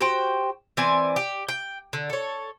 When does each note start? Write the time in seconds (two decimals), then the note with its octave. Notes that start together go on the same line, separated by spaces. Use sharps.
0.01 F#4 G4 C5 G5
0.77 E3 C4 D5 G#5
1.16 G4
1.48 G5
1.93 D3
2.10 A4 C#5